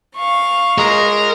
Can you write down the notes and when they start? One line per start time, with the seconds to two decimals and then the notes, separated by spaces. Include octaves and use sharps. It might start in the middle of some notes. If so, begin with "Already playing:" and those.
0.17 F5 C#6
0.78 G#3 A#4